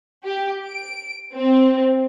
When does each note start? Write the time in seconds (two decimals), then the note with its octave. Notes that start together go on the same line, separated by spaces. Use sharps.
0.24 G4
0.66 D7
1.34 C4